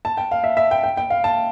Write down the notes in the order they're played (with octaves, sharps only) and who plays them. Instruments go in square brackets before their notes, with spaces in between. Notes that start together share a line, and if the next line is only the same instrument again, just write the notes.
[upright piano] A5
G5
F5
E5
E5
G5
G5
G5
F5
A5